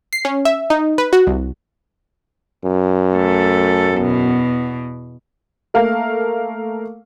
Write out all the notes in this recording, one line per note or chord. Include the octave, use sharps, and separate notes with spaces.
C7
C#4
E5
D#4
B4
F#4
C2
F#2
A3 A4
E2 B2
A3 A#3 A#4 F5